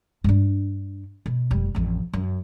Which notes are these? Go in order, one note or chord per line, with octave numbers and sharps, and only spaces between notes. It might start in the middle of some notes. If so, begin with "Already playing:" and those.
G2 D4
B2
F1 G3
A1 F2
F#2